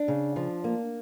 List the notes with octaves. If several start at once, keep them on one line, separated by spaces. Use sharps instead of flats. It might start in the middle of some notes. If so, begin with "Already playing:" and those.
Already playing: D4
C#3
F3
A#3